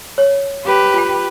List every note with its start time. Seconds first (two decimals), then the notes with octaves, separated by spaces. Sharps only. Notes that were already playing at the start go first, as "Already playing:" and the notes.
0.18 C#5
0.64 G4 B4
0.94 F4 G5